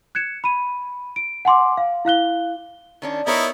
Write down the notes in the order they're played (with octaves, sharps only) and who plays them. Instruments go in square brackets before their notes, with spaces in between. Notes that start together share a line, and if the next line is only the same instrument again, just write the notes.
[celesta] F#6 G#6 C#7 E7
B5 D#7
D7
F#5 G#5 C6 D6
F5
E4 F5 F#6 G7
[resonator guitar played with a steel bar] D#3 C#4 D4
[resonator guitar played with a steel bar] B3 A#4 C#5 [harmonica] D#4 E4